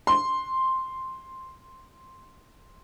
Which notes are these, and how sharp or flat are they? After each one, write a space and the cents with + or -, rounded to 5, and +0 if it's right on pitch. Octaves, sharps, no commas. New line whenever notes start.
C6 +0